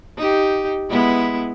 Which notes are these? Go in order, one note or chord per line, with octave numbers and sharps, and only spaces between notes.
D#4 G4
G#3 B3 E4